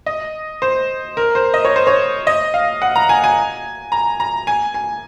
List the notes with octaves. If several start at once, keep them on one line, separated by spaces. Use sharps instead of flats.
D#5
C5
A#4
C5
D#5
C#5
C5
C#5
D#5
F5
F#5
A#5
G#5
G#5
A#5
A#5
G#5
G#5